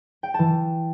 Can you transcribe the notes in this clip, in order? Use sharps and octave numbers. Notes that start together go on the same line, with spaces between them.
G5
E3 A5